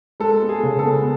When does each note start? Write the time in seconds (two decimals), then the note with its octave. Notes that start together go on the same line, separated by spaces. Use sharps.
0.20 G#3 A4
0.42 B3
0.49 G#4
0.63 C#3
0.79 A4
0.86 B3